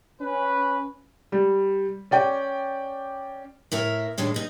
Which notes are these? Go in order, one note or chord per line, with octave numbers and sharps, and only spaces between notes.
C#4 B4
G3
C#4 D5 G5
A2 E4 A#4 E5
A2 D#3 G#3 D4
D#4 D#5